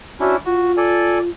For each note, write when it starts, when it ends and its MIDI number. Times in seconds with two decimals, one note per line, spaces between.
0.20 0.36 61
0.20 0.36 62
0.20 0.36 64
0.20 0.35 66
0.45 1.29 65
0.45 0.72 66
0.77 1.19 69
0.77 1.19 74
0.77 1.19 80